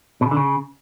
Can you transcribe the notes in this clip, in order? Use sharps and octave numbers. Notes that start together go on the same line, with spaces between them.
B2
C#3
D3
C#3